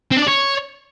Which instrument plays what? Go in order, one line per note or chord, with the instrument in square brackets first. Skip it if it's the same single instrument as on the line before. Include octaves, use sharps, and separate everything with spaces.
[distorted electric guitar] C4
D4
D5
C#5